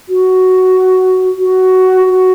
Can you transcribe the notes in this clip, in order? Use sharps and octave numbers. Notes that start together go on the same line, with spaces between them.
F#4
F#4
F#4